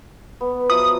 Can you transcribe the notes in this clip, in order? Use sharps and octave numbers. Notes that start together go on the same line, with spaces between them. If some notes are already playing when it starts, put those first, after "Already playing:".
B3
F3 F#3 E5 D#6